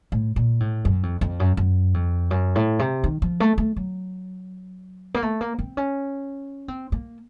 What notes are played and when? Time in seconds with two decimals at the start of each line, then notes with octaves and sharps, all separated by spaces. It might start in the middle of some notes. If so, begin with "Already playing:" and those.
0.12 A2
0.36 A#2
0.60 A2
0.85 F#2
1.03 F2
1.21 F2
1.40 F#2
1.57 F#2
1.94 F2
2.31 F#2
2.56 A2
2.79 C3
3.04 D#3
3.22 F3
3.40 A3
3.58 A3
3.76 F#3
5.14 A#3
5.23 A3
5.41 A#3
5.59 C4
5.77 C#4
6.68 C4
6.92 A#3